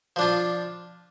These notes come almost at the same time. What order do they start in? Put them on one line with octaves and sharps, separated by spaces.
F3 D4 F4